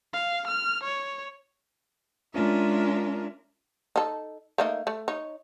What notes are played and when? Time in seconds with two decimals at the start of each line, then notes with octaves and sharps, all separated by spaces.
0.13 F5
0.47 F6
0.83 C#5
2.34 G#3 C#4 D4 F4 A#4 E5
3.96 D#4 A4
4.58 A3 A#3 D#4
4.87 A3
5.08 D#4 C#5